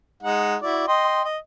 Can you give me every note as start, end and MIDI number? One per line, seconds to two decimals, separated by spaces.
0.23 0.56 56
0.23 0.56 63
0.23 0.56 78
0.62 0.84 64
0.62 0.84 66
0.62 0.84 74
0.88 1.22 75
0.88 1.22 79
0.88 1.22 84
1.25 1.38 75